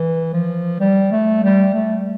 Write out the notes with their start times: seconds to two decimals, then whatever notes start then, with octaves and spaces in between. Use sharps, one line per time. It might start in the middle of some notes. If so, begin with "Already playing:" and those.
Already playing: E3
0.33 F3
0.80 G3
1.12 A3
1.43 G3
1.74 A3